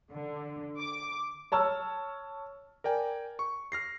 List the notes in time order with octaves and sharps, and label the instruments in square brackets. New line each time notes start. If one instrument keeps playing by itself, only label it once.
[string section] D3
D6
[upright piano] C#5 A5 E6 F6
[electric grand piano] A#4 D5 G5 G#5
C#6
F6 A#6 C7